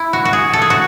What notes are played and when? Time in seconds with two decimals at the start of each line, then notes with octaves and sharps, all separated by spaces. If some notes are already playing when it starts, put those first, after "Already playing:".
Already playing: E4
0.13 F#4
0.25 F#4
0.33 G#4
0.53 A4
0.62 G#4
0.70 F#4